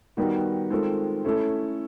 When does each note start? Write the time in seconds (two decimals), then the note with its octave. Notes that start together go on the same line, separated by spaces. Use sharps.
0.17 D#3 G3 B3 D#4 F#4
0.70 D#3 G#3 C4 F4 A4
1.25 A3 C#4 E4 A4